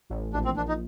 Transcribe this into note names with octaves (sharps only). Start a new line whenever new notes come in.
A1
A#1 D4
C4
A#1 D4
D#4